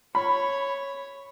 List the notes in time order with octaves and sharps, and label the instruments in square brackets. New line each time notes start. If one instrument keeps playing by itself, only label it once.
[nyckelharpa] C#5 [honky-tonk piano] B5